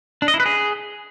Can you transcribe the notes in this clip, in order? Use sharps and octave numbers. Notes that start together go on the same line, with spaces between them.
D4
D#5
E4
B4
G#4